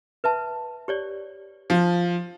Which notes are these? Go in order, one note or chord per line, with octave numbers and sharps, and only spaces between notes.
B4 E5 A5
G4 C#5 D5
F3